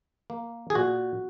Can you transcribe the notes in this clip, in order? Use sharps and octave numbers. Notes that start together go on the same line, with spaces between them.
A#3
G#4
A#2 F#4